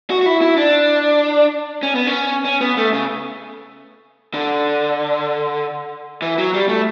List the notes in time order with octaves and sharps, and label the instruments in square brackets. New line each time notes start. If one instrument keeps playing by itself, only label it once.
[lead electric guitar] F#4
F#4
E4
E4
D4
C#4
B3
C#4
C#4
B3
A3
C#3
D3
E3
F#3
G3
A3